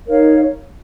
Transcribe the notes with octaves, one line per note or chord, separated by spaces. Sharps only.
D#4 A#4 C#5 F5